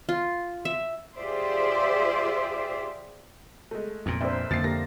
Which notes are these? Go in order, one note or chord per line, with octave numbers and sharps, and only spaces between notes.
F4
E5
F4 G4 G#4 C5 D5 E5
G#3 A3
F2 A#2
F1 D4 C5 E5
F2 D3 A#3 E5 A6 C7
A#3 G4 A#4 A#6